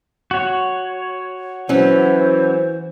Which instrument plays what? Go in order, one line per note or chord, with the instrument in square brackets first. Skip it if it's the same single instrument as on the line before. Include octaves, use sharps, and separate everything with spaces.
[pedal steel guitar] F#4 C#5
[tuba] E3 [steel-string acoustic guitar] F#3 C#4 [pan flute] C5